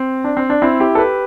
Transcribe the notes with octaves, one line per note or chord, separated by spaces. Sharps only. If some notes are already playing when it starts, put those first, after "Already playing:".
Already playing: C4
D4
C4
D4
C4 E4
E4 G4
A4
G4 B4